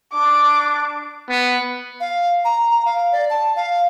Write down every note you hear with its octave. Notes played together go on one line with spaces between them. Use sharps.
D4 D6
B3
F5
A#5
A#5
F5
D5
A5
F5